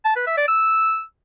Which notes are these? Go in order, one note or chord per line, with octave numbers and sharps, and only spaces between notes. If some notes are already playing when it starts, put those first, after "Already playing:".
A5
B4
E5
D5
E6